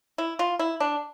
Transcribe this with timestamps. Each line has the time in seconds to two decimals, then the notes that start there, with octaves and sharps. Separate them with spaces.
0.18 E4
0.39 F4
0.59 E4
0.80 D4